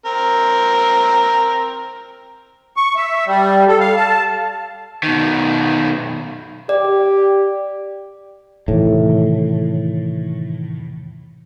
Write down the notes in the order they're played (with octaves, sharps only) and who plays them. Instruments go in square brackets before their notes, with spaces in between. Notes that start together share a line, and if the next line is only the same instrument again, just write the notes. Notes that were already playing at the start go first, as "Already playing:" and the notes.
[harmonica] C4 A#4
[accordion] C#6
E5
G3
A4
F5
A5
[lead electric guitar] B2 D#3
[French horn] G4 [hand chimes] D5
[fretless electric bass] A2 [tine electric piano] C3 D#3 E3